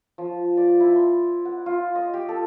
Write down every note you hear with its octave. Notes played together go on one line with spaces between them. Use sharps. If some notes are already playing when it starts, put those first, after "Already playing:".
F3
D5
E4
C6
F#5
F4
D#5
G4
A4